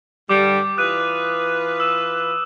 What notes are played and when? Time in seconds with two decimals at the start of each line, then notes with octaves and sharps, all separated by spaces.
0.29 G2 D3 G3 D6
0.77 E3 F4 B4 D#6 F#6 D#7
1.80 E6 E7